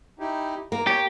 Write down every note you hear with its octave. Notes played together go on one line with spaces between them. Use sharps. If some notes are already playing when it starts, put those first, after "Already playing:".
D#4 E4 G4
A#3 A#5
G4 C#5 G5